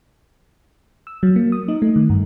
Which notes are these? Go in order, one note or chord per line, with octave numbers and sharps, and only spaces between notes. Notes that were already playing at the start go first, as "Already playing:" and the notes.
E6
F#3
A#3
D#6
D#4
A3
D#3
G2